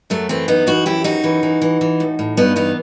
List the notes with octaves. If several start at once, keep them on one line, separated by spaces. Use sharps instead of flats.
F#2 F#3 A3
E3 A3 C4
F#2 B3 D#4
E3 D#4 F#4
F#2 E4 G4
F#2 D#4 F#4
E3
E3
E3
E3
A2
A2
G2 B3 D#4
E3 B3 D#4